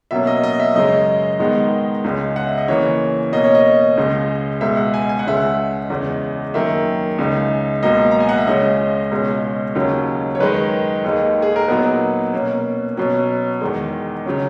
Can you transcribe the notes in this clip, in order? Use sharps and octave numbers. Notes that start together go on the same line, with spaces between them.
B2 F#3 A#3 C#4 E5
D#5
D#5
E5
F#2 C#3 G#3 C#4 D#5
G#2 D#3 G#3 B3
C#2 C#3 G#3
F#5
E5
D#5
C#3 E3 A#3 C#5
B2 A#3 C#4 D#5
C#5
D#5
C#2 C#3 G#3
C#2 B2 G#3 E5
F#5
G#5
G#5
F#5
C#2 C#3 G#3 E5
F#5
E2 C#3 G#3
F#2 D#3 A#3 E5
C#2 C#3 G#3 D#4
C#2 B2 F#3 A#3 D#5
A#5
G#5
F#5
E5
C#2 C#3 G#3 C#4 D#5
C#2 B2 G#3 C#4
D#2 C#3 F#3 C#4
C#5
F#2 D#3 G#3 B4
D#2 D#3 G#3 D#4
G#4
A#4
A#2 F#3 B3 D#4 B4
B2 A#3 C#4
B2 F#3 C#4
E2 D#3 G#3
C#3 F#3 C#4